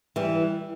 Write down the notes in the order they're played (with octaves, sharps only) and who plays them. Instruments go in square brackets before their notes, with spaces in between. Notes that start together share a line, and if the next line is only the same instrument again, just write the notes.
[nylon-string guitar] E3 G3